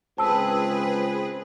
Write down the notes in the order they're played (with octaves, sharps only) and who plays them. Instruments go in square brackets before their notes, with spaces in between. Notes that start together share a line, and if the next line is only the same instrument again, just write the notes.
[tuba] C#2 [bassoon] C4 [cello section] G#4 B4 [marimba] A5 E6